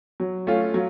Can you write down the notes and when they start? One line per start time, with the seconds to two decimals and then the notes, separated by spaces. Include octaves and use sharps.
0.20 F#3
0.47 A3 C#4 F4
0.74 F#3